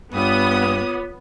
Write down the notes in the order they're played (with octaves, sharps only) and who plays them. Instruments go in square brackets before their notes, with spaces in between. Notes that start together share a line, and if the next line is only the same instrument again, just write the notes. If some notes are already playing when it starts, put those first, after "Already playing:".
[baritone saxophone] G2 [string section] B3 [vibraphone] F4 C#5 D6 [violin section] D#6